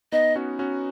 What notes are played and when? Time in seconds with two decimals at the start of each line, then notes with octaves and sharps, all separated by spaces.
0.12 B3 D#4 D#5
0.36 C#4 F#4
0.59 C#4 F#4